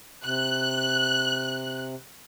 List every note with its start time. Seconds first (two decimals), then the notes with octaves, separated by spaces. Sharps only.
0.24 C3 F#6